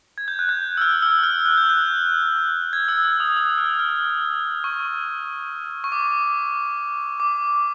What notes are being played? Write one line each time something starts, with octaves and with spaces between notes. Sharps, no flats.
G#6
G6
F#6
G6
E6
F6
E6
F6
F#6
G6
F#6
G#6
E6
E6
D#6
D#6
F6
F6
C#6
C#6
D6
D6